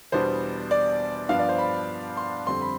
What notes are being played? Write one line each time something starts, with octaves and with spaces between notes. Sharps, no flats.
E2 B2 G3 B3 D4 C5
D5
G2 F3 B3 D4 F5
D5
C5
B5
C6
F2 D3 G3 C4 C6
B5